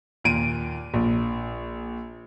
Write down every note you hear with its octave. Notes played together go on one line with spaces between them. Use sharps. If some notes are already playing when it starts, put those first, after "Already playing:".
D#2 A#2 D7 D#7
A#1